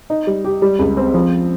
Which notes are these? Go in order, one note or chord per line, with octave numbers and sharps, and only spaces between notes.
D#4
G3
G4
G3
C#2
C4
F3